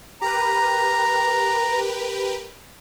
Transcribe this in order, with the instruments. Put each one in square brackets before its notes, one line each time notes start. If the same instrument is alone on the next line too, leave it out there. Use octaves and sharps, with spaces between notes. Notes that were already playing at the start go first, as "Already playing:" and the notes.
[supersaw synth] G4 A#4 B4 [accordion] A#5